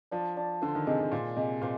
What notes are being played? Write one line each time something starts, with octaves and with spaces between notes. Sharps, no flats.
F3 D4
D4
D3 C5
D#3
C3 G#3
C3
A#2 C5
C3 G#3
A#2 C5